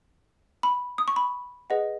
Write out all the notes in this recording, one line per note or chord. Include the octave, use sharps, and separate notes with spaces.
B5
D#6
C#6
B5
G#4 B4 D#5 F#5